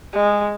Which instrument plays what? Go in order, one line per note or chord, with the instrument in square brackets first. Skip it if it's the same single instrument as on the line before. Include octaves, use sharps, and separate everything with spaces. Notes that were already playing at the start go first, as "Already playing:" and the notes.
[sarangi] G#3